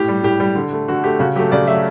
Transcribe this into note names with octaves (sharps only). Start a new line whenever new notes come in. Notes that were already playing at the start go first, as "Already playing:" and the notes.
Already playing: A2 G4
G3
A2 G4
G3 G4
D3
A3
D3 F#4
A3 G4
C#3 F#4
F#3 A3 G4
C#3 D5
F#3 A3 E5